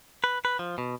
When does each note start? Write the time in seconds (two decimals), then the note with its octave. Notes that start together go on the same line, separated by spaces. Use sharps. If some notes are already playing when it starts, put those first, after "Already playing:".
0.24 B4
0.45 B4
0.59 F3
0.78 B2